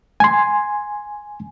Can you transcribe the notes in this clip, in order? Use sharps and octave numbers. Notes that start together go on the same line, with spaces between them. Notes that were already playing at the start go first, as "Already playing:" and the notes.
G#5 C6